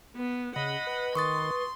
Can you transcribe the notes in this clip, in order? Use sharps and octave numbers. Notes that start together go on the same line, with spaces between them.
B3
C#3 D#5 F#5 B5
B4
D#3 C6 C#6 D#6 A6